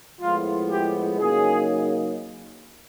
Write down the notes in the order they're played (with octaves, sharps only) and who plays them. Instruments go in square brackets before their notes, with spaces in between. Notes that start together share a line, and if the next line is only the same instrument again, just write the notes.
[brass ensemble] A2 F3 G#3 B3 E4 F4
G4
C#3 F#3 A#3 D#4 G#4